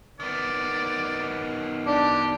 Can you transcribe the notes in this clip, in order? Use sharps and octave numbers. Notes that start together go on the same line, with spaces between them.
D#3 B3 D5
D4 G4